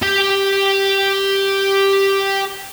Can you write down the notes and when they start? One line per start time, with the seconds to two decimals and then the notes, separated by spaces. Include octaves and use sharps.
0.03 G4 G5